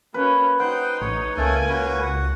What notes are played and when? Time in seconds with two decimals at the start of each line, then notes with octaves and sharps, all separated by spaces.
0.14 A#3 C#4 B4
0.60 D#4 C5 F#5 G5
1.01 A1 C#5
1.37 C#2 A3 A#3 C#4 A4 G#5
1.69 C#4 F#4 B4
2.02 F#4 F#5